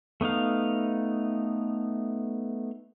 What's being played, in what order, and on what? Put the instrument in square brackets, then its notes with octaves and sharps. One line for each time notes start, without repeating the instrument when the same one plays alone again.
[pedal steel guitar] A3 B3 D#4 F5